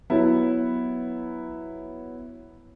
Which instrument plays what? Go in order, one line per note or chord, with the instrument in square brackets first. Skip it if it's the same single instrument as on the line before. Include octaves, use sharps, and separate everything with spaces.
[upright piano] F#3 B3 E4